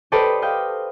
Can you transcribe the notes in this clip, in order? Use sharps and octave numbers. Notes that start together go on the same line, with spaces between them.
G4 A4 B4 C5 D5 D#5
D#5 F5 G5